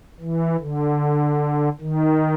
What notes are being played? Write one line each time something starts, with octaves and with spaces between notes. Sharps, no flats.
E3
D3
D#3